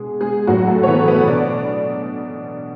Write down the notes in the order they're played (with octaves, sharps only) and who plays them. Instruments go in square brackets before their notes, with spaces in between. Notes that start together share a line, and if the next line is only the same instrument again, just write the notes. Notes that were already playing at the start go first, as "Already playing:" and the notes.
Already playing: [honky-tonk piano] B2 G#3 G#4
G#3 G#4
A2 F#3 F#4
A3 A4
C#5
E3 B3 B4
B3 B4
B2 D4 D5